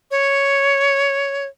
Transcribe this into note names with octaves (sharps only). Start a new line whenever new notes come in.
C#5